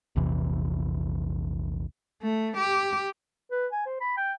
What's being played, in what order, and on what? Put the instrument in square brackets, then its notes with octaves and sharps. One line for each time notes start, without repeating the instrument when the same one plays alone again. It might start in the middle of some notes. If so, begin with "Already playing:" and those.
[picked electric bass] A#1 E2 C3 E3
[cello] A3
G4
[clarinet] B4
G#5
C5
B5
G5